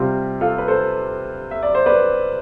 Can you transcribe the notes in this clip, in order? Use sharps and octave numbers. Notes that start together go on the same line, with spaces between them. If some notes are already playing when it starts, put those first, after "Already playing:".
Already playing: C3 G3 C4 F4
F4 A4
B4
A4 C5
E5
D5
C5
B4 D5